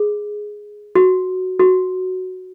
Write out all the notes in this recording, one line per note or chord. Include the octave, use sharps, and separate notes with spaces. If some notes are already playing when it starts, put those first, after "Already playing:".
Already playing: G#4
F#4
F#4